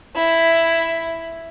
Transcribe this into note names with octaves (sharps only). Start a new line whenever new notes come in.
E4